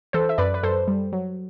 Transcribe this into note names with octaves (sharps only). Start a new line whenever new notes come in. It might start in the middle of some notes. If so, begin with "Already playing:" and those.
E3 A4 C5
E5
F#2 B4 D5
B4
F#2 A4 C5
G3
F#3